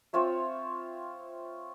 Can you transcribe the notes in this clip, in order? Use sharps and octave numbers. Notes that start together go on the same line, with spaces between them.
C4 F4 C#5 E5